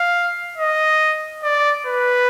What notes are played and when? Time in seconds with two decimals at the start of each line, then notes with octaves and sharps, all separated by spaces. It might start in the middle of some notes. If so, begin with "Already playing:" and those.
Already playing: F5
0.58 D#5
1.44 D5
1.87 B4